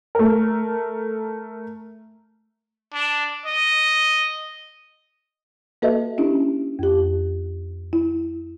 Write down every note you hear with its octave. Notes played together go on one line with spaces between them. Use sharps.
A3 A#4
D4
D#5
A#3 F#4 A4 B4 D#5 E5
C#4 D4 E4 G4
F2 G4
E4